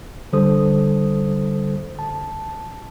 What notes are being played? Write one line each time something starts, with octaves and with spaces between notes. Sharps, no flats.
D3 G3 A4 C5 D#6
A5